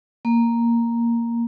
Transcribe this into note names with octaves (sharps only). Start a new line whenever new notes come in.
A#3